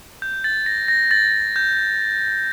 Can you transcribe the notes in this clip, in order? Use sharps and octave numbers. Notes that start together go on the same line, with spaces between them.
G6
A6
A#6
A#6
A6
G6